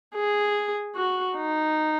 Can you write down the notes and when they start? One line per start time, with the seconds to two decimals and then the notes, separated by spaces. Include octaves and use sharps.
0.15 G#4
0.96 F#4
1.37 D#4